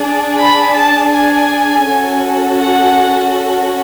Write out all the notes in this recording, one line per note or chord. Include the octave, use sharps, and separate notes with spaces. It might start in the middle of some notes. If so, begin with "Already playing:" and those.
Already playing: D4 G#4
B5
A5
G#5
C#4 F#4 A4
F#5